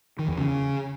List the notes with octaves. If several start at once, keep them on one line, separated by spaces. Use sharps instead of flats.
D#3
E2
C#3